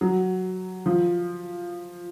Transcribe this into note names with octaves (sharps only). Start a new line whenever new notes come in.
F#3
F3